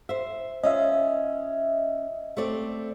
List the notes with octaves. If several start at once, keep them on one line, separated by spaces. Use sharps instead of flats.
C5 E5
C#4 F4 D#5 E5
A3 C4 D5